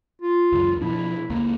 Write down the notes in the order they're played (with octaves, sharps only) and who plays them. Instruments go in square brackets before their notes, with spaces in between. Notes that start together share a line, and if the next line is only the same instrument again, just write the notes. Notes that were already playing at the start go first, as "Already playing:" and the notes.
[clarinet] F4
[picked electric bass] C#2 F#2
[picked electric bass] B2 F3 D4 [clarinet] E4
[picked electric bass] C#2 A#3